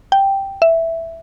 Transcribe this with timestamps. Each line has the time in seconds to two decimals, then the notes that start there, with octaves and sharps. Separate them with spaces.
0.12 G5
0.62 E5